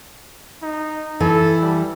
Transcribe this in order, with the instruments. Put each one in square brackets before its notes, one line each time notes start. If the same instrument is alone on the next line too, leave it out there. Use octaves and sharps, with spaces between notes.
[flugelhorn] D#4
[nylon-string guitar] E3 [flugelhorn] A4
[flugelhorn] G3